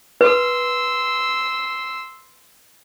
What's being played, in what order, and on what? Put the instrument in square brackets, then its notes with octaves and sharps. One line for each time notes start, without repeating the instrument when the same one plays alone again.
[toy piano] B4 [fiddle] C6 E6